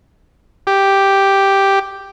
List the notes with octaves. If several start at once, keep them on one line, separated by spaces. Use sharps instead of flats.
G4